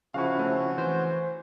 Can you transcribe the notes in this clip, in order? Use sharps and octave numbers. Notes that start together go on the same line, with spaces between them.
C#3 F3 C#4 E4 F#4 F5 C#6
A3 C4
E3 C5